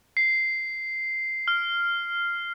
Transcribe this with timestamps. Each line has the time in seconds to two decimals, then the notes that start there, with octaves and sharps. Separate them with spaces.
0.17 C7
1.48 F6